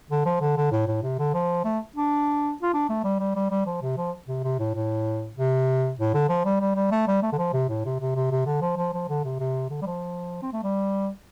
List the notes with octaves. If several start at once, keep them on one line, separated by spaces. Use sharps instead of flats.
D3
F3
D3
D3
A2
A2
C3
D3
F3
A3
D4
F4
D4
A3
G3
G3
G3
G3
F3
C3
F3
C3
C3
A2
A2
C3
A2
D3
F3
G3
G3
G3
A3
G3
A3
D3
F3
C3
A2
C3
C3
C3
C3
D3
F3
F3
F3
D3
C3
C3
D3
G3
F3
C4
A3
G3